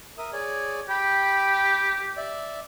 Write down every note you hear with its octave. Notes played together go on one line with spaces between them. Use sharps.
A#4 E5 D#6
G#4 C#5 D5
G4 G5 B5
D5 E5